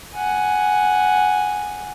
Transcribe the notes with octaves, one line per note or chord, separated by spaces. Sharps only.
F#5 G#5